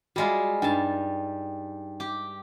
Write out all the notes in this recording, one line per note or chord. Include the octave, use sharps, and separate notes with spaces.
G3 G#3 F4 F#4
G2 D#4 G5 A5
G4